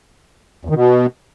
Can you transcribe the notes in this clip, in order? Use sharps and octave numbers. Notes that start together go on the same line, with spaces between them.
E2
D#3
B2